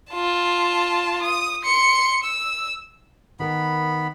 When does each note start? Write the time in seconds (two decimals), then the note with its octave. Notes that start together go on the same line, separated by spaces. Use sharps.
0.12 F4 A5
1.22 D#6
1.64 C6 C#7
2.24 E6
3.40 D#3 B3 A#4 B5